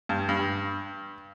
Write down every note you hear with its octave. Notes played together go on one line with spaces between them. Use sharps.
G2
G2